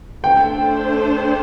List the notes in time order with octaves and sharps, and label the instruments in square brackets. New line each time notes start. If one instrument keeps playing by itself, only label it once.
[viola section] A3 D4 A4 C5 [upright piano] G5